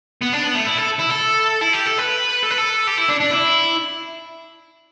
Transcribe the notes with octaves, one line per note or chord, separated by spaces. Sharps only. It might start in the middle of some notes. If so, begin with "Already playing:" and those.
B3
D4
B3
A3
E4
A4
E4
A4
E4
G4
A4
B4
A4
B4
A4
G4
E4
D4
D4
E4